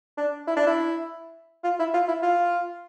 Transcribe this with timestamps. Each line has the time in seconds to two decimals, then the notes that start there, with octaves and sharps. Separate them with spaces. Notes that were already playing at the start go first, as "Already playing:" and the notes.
0.17 D4
0.47 E4
0.57 D4
0.67 E4
1.64 F4
1.79 E4
1.94 F4
2.08 E4
2.22 F4